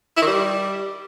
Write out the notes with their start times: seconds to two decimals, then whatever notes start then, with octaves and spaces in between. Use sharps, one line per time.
0.17 E4
0.22 D#3
0.27 G3